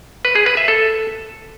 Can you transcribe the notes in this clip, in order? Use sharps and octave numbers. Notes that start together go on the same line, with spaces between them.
B4
G#4
B4
E5
A4